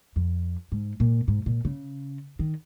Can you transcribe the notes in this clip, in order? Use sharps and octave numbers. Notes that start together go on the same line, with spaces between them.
F2
G#2
A#2
G#2
A#2
C#3
D#3